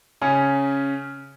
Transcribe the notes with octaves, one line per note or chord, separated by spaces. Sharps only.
C#3 C#4